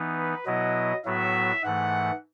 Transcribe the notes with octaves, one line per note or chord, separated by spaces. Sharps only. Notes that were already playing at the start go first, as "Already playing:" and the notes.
Already playing: E3 B3 D#4
B4
B2 F#3 B3 E4 D#5
A2 F#3 B3 F#4 E5
G#2 E3 A3 F#5